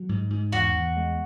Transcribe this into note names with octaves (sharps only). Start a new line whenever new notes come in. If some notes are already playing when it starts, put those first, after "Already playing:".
Already playing: F#3
G#2
G#2
E2 F#4
E2
G#3